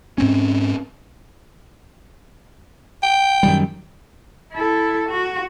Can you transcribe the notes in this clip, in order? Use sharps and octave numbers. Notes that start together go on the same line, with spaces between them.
G#2 C4 C#4
G5
F#2 D#3 G3
E4 A4
F#4